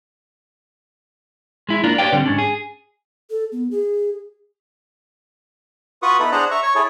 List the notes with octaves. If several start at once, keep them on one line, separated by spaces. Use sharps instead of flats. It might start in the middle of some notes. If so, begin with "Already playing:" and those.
G#3 E4
A#3 D4 F4 A#4
G4 B4 C#5 D5 F5 G5
D3 G3 A#3 C4
G#2 C#4 D4
G#4
A4
B3
G#4
F4 F#4 B4 C#6 D#6
B3 D#4 E4 A4 B4
D4 G#4 C5 F#5 A#5
E5 A#5 C#6
C#5 C#6
E4 G#4 A4 C#5